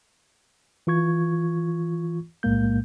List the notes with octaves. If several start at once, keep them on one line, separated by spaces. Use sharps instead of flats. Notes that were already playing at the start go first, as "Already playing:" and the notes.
E3 F4 C#6 G#6
B1 A2 G#3 A#3 G6